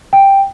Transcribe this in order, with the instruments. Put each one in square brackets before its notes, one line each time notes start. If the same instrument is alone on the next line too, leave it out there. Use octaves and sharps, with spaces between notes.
[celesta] G5